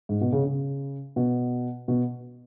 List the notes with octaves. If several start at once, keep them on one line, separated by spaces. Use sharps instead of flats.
G#2
B2
C#3
C#3
B2
B2